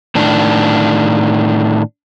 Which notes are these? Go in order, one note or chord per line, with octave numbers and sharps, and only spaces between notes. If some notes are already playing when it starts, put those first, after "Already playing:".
A2 D#3 D4